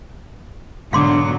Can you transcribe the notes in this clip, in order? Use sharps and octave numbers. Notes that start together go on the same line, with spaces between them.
G#2 B2 D3 F#3 F5 C6 D6